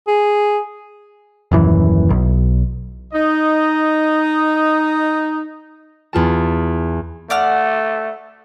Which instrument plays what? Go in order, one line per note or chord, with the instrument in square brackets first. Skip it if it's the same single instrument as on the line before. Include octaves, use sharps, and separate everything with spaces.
[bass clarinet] G#4
[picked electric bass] D#1 F#2 E3
B1
[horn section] D#4 D#5
[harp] E2 F4 A5
[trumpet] A3 [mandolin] D5 F#5 F6